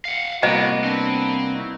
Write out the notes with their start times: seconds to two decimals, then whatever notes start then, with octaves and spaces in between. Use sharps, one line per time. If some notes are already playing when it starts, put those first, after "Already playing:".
0.05 F5 F#5
0.43 C2 A2 A#3 B3 F#4 D#5
0.84 C4 D4 B4
1.54 D#4 E4 F#4